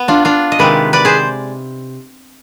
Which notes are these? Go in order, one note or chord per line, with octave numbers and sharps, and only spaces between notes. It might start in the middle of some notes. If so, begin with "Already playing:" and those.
Already playing: B3
D4 F4
D4 F4
D#5
C3 D#3 G#3 B4 D5
B4 D5
G#4 C5